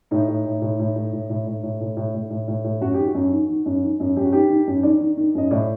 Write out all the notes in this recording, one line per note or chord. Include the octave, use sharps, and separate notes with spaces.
A2 D#4
A2
A2
A2
A2
A2
A2
A2
A2
A2
A2
A2
A2
A2
A2
A2
F#2 F#4
D#3 G4
F#4
F#2
D#3
D#3
F#2
D#3
F#2
F#2 G4
F#4
D#3 G4
D#3
F#2
D#3 D5
D#3
D#3
F#2 D#5
A2 D5